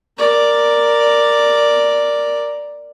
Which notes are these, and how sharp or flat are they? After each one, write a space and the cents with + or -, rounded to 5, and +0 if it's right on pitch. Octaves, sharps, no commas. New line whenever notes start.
A#4 +0 D5 +0